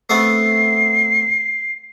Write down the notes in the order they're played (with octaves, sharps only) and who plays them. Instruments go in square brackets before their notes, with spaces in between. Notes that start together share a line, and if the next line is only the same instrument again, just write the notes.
[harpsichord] A3 B3 C4 [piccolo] C7